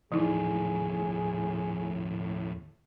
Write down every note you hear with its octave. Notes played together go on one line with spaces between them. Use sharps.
D#2 A2 E3 F3 D#4 E4 G#4